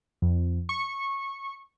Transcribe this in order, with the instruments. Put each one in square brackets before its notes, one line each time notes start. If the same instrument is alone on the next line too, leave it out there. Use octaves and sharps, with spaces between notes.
[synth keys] F2
C#6